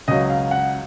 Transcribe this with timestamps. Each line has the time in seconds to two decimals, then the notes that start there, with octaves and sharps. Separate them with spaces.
0.08 C#2 C#3 F#3 D#5
0.30 F5
0.51 F#5